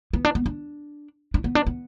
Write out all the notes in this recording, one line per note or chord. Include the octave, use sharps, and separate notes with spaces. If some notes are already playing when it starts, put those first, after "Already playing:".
B3
D4
B3
D4
D4
B3
D4
B3